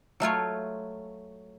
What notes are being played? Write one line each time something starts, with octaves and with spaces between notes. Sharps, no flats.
F#3 A3 F4 C#5